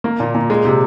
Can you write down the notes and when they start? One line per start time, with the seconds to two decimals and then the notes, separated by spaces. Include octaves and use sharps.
0.04 A#3
0.20 A#2
0.35 A#2
0.50 G#3
0.65 C3